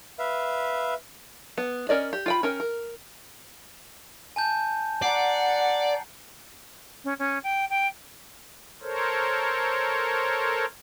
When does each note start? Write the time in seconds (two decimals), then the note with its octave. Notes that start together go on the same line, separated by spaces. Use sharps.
0.19 B4 E5 F5
1.58 B3
1.89 C#4 A#4 D5 D#5
2.13 G4
2.26 F4 G5 B5
2.43 C#4 A#4 G5
2.60 A#4
4.36 G#5 A5 G6
5.02 D5 F#5 A#5 C7
7.04 C#4
7.19 C#4
7.43 G5
7.70 G5
8.82 A4 A#4 C5 C#5